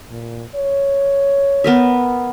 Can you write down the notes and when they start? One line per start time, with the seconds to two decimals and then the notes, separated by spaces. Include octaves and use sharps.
0.11 A#2
0.55 C#5
1.64 B3 A#4 E5